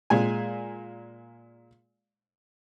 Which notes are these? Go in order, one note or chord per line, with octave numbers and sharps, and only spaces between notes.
A#2 G#3 G#5